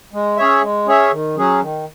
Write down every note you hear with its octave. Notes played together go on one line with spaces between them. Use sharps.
G#3
C#4 G#4 C#5 E5
G#3
C#4 G#4 C#5 E5
D#3
F#3 C#4 G#4
D#3